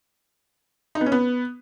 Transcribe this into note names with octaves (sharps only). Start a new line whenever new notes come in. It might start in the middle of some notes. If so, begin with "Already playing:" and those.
D#4
B3
C#4
B3